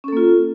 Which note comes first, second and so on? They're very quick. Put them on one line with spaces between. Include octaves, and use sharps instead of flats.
C#4 A4 A#3 F4